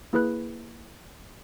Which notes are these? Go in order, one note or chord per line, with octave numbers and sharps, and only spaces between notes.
A#3 E4 G#4 B4 B5 F#6